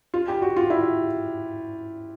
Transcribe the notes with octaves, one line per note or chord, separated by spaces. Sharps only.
F4
G4
F#4
F4
E4